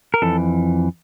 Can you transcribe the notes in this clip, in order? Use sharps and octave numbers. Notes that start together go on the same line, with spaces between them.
A#4
F2 E3 A4